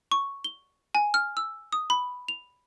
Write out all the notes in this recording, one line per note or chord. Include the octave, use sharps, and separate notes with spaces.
C#6
G7
G#5
F6
E6
D#6
B5
F7